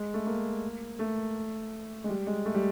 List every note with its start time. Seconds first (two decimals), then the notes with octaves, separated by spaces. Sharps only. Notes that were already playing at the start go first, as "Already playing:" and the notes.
Already playing: G#3
0.14 A3
0.26 A#3
0.99 A3
2.04 G#3
2.09 G3
2.27 G#3
2.45 A3
2.54 G3